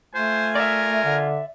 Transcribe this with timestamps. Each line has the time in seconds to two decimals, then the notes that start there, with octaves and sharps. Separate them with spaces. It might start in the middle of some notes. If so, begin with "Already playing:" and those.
0.15 A3 F4 C5 G#5
0.55 A#4 D5 E5
1.04 D3